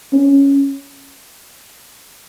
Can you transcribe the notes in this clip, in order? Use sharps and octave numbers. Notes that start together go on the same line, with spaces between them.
C#4